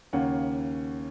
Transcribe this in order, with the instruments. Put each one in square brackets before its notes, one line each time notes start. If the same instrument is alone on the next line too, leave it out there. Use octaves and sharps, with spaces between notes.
[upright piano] D#2 C#3 A#3 C#4 F#5